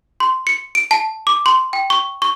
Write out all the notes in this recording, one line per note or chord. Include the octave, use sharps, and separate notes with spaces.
C6
C#7
D7
A5
D6
C6
G5
C#6
C#6